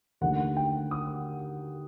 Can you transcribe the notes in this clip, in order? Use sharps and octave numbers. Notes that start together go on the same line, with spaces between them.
D#2 D3 A3 F#5
G5
D#6